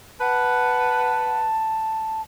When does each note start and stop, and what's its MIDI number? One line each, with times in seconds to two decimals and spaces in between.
0.20 1.46 71
0.20 1.46 78
0.20 2.22 81